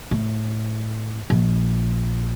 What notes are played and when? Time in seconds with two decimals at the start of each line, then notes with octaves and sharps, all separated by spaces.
0.11 A2
1.30 A#1